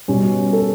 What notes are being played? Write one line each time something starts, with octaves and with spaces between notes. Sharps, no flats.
B2 G3 C#4
A4